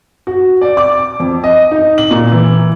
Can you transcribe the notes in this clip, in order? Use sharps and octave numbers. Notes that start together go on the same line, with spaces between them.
F#4
D5
D6
F2
D#5
D#4
F#7
A#2
E3